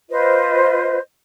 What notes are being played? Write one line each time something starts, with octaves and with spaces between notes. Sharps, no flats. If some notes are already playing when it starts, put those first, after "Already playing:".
F4 B4 C5 D#5